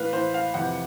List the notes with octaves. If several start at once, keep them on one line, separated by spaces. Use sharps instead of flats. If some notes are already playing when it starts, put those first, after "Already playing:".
Already playing: A2 E3 B4 F5
A2 E3 C5
F5
F2 C3 E3 F#5